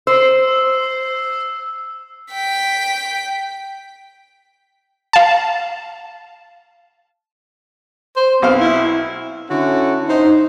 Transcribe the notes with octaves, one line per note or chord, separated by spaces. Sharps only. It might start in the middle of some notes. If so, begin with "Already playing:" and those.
C5 E6 C7
G5 B6
F5 A5
C5
B1 C4 F5
E4
D3 C#4 E4 F#4 A4 F#5
D#4 C5